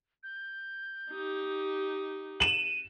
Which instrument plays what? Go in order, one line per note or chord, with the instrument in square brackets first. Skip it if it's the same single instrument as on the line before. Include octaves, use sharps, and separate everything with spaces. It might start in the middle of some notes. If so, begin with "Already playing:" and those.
[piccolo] G6
[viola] D#4 G4
[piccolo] D#7 [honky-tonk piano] E7 F#7